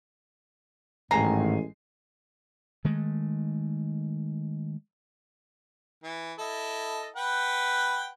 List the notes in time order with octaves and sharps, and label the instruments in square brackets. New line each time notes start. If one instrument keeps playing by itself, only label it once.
[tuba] A1 [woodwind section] G#2 D#3 A3 [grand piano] G#3 G#5 C7 [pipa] A#5
[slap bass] D#3 G#3 A3
[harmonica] E3
E4 A4 D#5
B4 F#5 G5